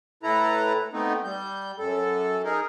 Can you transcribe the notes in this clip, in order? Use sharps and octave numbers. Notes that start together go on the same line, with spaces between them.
A2 E4 A4 B4 A#5
A3 B3 C4 D#4
G3 G6
F#2 A4
D#4 G#4 A#4